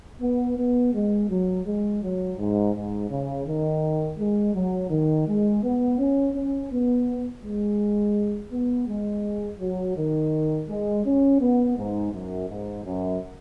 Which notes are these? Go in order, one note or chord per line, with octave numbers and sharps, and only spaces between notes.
B3
B3
G#3
F#3
G#3
F#3
G#2
G#2
C#3
D#3
G#3
F#3
D#3
G#3
B3
C#4
C#4
B3
G#3
B3
G#3
F#3
D#3
G#3
C#4
B3
G#2
F#2
G#2
F#2